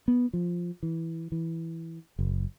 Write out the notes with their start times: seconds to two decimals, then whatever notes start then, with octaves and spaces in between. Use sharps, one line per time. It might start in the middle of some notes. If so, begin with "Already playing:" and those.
0.08 B3
0.33 F3
0.83 E3
1.32 E3
2.19 F#1